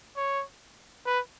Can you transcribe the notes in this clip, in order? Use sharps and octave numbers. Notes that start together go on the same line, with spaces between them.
C#5
B4